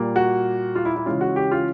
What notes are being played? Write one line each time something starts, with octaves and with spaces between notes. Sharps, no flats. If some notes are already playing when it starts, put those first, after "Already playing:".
Already playing: A#2 G3 A#3
F#4
F4
E4
E4
C#3 E3 G#3 C#4 F4
F#4
G4
F4